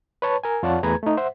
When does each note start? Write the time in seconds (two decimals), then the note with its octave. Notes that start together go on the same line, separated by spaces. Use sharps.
0.22 B4 C#5 A5
0.44 A#4 G#5
0.63 F2 F4 C#5 D5 F#5 A5
0.83 E2 A3 G#4 B4 A#5 G#6
1.03 A3 D#4
1.17 C5 E5 F#5